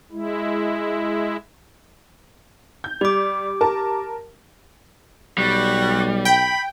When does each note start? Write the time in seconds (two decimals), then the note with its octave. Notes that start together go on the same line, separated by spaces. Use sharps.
0.11 G#3 E4
2.84 G6
3.01 G3 G4 D6
3.61 A#4 A5
5.38 B1 G3 F#4
6.25 G5 B5